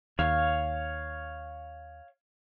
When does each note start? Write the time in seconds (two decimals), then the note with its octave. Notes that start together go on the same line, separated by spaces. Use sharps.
0.19 D#2 C#5 F5